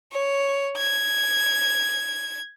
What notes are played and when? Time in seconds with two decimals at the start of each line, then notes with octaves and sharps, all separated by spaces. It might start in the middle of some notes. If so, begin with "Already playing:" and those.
0.14 C#5
0.78 G#6